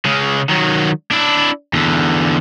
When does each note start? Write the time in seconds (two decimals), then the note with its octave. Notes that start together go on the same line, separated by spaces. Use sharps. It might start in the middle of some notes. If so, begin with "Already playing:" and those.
0.05 C#3 G#3
0.50 D#3 F#3
1.11 D4 E4
1.73 E2 D3